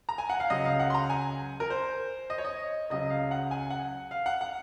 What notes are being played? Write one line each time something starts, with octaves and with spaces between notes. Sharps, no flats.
A#5
G#5
F#5
F5
C#2 C#3 F#3 D#5
F5
F#5
C6
A#5
G#5
A#4
C5
D#5
C#5
D#5
C#2 C#3 F#3 D#5
F5
F#5
G#5
F#5
F5
F#5
F#5